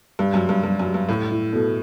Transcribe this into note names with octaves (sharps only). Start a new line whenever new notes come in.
G2 G3
F#2
G3
G2
G2 G3
F#2
G3
G2
A2 E4
E4
B2 A4